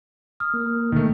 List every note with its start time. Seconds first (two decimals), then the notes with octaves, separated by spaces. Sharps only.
0.40 D#6 F6
0.54 A#3
0.92 D2 B2 D#3 A3 A#3